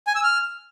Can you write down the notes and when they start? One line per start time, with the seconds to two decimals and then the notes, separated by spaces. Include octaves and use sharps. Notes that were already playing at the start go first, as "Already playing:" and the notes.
0.07 G#5
0.15 E6
0.24 F6